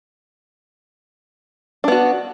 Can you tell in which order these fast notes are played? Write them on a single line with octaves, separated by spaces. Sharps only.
D4 B3 F#4